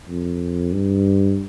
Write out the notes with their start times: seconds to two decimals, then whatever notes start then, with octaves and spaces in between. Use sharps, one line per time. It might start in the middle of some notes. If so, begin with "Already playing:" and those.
0.08 F2
0.73 G2